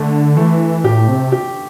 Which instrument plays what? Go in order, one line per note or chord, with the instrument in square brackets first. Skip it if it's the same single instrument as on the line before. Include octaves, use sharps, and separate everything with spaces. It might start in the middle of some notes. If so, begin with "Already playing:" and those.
Already playing: [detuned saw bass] D3 [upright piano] A3
[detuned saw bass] E3 [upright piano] A3
[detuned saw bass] A2 [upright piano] G4
[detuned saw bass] C3
[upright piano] G4